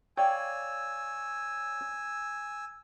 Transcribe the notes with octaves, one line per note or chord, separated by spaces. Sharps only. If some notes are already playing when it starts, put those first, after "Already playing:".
C#5 D5 F5 G5 G#5 E6